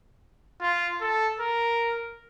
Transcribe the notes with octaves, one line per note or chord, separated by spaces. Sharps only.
F4
A4
A#4